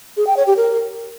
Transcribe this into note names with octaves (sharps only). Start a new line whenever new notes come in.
G#4
G5
C#5
G4
A#4